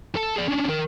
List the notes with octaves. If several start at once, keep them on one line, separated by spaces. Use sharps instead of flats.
A4 A5
G#4 D5
C#4 D4
D#3 A#4